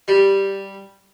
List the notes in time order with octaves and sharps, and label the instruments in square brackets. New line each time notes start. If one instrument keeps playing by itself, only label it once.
[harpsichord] G3